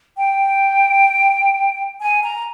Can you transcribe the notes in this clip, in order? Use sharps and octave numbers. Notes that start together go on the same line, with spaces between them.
G5
G#5
A#5